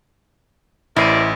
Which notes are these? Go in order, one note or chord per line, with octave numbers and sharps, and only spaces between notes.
A1 E4 A#4 C5 D5 C7 D#7